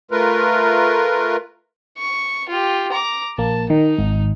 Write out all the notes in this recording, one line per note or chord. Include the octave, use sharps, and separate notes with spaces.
A3 F4 A#4 B4
C#6
F4 G4
A#5 D6
A#1 A#3 A5
D#3 D#4
G#1